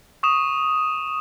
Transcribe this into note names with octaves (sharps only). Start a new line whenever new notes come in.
C#6 D#6 E7